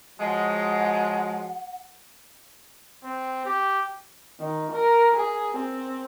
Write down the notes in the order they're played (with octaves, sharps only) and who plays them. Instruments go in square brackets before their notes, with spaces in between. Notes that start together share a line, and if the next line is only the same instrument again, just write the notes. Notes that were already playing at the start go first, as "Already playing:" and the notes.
[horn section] F3 F#3 G#3 [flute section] F#5
[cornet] C4
G4
[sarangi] D#3
A#4
G#4
C4